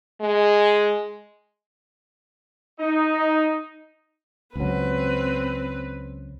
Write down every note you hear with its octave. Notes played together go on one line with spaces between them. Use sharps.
G#3
D#4
C#2 F#3 C4 B4